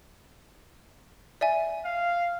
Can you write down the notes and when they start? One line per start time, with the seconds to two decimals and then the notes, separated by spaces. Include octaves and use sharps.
1.41 D5 E5 G#5
1.85 F5